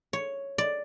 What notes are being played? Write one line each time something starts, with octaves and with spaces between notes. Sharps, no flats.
C#5
D5